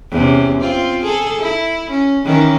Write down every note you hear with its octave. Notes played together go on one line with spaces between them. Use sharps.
E2 C3 C#4
C4 F4
G#4 A4
E4
C#4
D#3 E3 C#4